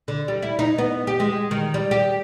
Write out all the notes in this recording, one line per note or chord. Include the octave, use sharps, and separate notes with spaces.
D3
G3
E4
D#4
B3
G4
G#3
D#3
G3
G4